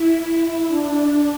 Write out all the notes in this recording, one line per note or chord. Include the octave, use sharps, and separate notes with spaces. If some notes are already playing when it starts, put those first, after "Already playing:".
Already playing: E4
D4